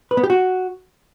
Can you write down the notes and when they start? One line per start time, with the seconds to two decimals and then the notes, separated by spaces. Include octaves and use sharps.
0.11 B4
0.17 B3
0.23 G4
0.30 F#4